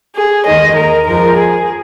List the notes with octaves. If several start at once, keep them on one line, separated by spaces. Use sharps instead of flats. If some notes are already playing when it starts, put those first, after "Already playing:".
G#4
D#2 D#3 G#3 D#5
A#4
F2 F3 G#3 A#4
G#4